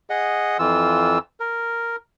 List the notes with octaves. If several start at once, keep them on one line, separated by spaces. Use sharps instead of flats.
G#4 D#5 F#5
F2 E3 F4 E6
A#4